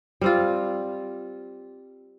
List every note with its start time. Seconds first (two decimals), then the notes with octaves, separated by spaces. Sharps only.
0.21 G3 C4 F4